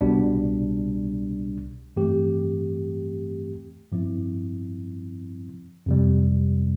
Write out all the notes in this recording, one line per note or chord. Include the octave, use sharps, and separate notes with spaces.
C2 B2 G3 D4
G2 E3 A3 C4 G4
G2 F3 C4 E4
F2 C3 G3